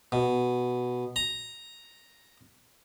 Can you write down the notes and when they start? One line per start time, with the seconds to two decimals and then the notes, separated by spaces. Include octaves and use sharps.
0.12 B2
1.16 A#5